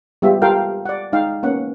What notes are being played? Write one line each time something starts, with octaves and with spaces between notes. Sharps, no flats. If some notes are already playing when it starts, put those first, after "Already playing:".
G3 G#3 B3 F4 G4 E5
F4 G4 A4 A#4 F5 G5
D5 F#5
G#3 D#4 F5 G5
A#3 B3 C#4 F#5